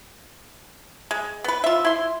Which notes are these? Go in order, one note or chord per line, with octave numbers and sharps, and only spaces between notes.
G#3
B3 B4
F4 E5
E4 C6